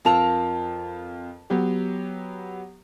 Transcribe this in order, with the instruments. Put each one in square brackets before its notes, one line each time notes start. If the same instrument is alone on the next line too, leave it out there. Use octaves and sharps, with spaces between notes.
[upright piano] F2 F4 F7 [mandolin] A#4 A5 E6
[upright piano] F#3 B3 G4